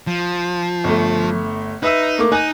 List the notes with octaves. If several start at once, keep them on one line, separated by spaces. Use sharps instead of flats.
F3
G1 A3
D#4 B4 E5 E6
A3 A#3 D6
D#4 G#5 F#6